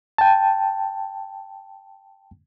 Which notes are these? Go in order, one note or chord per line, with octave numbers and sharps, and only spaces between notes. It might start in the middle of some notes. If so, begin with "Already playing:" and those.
G5 A5